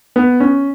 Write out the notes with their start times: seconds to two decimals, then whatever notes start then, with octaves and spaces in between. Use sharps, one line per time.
0.16 B3
0.40 C#4